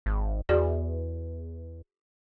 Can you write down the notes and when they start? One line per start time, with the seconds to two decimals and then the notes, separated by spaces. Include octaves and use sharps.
0.06 G#1
0.49 E2 F#4 G#4 D5